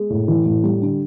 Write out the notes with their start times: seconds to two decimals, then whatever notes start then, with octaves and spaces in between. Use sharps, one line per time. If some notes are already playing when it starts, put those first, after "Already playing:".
Already playing: G#3
0.10 A2
0.28 E3
0.46 A2
0.63 G3
0.82 D3